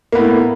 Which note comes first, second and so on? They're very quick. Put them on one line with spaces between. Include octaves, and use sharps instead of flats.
A#3 B3 A2